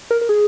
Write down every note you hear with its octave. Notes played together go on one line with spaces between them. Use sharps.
A#4
A#4
G#4